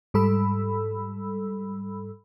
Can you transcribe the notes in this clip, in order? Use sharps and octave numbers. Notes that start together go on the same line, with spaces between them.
G#2 G3 A4 B5 E6